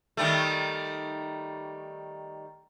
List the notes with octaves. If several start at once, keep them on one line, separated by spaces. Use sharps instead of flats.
D#3 G3 A3